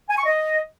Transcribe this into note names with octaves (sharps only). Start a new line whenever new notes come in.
G#5
C#6
D#5